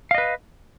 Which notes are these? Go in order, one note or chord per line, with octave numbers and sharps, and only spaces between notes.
B4 D#5 F5